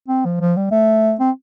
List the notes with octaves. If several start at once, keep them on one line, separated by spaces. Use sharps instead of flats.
C4
F3
F3
G3
A3
C4